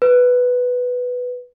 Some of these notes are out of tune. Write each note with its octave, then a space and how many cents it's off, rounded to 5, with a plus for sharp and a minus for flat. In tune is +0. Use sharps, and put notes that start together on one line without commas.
B4 +5